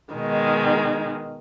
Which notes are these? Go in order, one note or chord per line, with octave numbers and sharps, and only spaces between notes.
B2 D#3 G#3